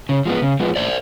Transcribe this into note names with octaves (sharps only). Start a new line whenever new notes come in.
C#3
F3 G#3 B3
C#3
F3 G#3 B3
A2 C5 D5